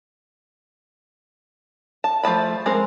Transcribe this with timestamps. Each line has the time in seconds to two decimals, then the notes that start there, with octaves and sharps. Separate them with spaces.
2.04 A5
2.23 F3 A3 A5 B5
2.66 G#3 C4 A#4